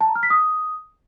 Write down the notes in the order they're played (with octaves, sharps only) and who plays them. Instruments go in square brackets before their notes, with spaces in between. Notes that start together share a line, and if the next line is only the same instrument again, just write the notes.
[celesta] A5
A#5
F6
B6
D#6